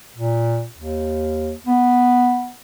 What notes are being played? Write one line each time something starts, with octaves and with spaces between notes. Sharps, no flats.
A#2
D#2
B3